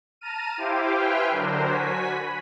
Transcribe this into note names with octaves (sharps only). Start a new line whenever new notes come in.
A5 A#5 F6 D#7
E4 G4 C5 F5 G5 D6
B4 E5 G5 G#5 C6 F6
D3 F#3 D4 A#4 C5
F#4 G#5 B6
B5